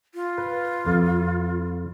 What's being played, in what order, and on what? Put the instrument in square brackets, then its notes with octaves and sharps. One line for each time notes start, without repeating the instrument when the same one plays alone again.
[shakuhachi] F4
[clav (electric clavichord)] B4
F2